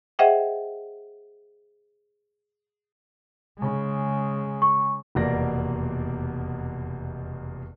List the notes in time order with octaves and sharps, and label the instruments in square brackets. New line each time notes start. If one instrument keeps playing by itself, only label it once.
[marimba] G#4 C5 D#5 E5 F#5 G5
[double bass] C#3 G#3
[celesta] C#6
[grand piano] F1 E2 B2 A#3 D5 A#6